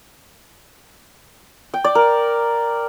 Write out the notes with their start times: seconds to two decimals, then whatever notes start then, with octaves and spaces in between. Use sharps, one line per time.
1.74 G5
1.84 D5
1.95 A#4